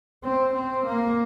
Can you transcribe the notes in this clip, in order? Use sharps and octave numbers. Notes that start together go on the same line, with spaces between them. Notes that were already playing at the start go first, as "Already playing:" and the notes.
C4
C4
A#3